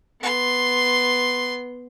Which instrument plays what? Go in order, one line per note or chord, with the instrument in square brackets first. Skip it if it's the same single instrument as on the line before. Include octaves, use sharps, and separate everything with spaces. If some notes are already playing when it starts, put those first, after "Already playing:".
[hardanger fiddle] B3 C6